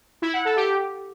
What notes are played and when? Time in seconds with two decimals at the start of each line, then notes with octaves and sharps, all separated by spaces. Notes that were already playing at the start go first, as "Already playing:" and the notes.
0.22 E4
0.34 F#5
0.45 A4
0.57 G4